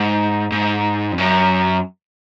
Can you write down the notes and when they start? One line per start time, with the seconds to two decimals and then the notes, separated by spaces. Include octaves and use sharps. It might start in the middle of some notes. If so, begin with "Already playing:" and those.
Already playing: G#2
0.52 G#2
1.12 F2
1.18 F#2